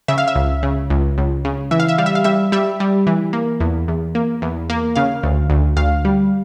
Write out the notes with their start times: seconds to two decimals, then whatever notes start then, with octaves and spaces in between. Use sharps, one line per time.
0.08 C#3 E5
0.18 F5
0.28 E5
0.35 C#2
0.63 C#3
0.90 C#2
1.18 C#2
1.45 C#3
1.71 E3 E5
1.80 F5
1.88 E5
1.98 G3 F5
2.06 E5
2.15 F5
2.24 G3 E5
2.52 G3 E5
2.80 G3
3.07 E3
3.33 A#3
3.60 E2
3.88 E2
4.15 A#3
4.42 E2
4.70 A#3
4.95 C#3 F5
5.23 D2
5.50 D2
5.77 D2 F5
6.05 G3